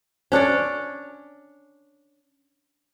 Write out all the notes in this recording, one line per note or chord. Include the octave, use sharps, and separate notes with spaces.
C#4 D4 C#5 D5